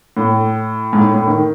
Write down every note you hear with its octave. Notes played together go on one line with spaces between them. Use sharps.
A2
G#2
A2
A2
D#3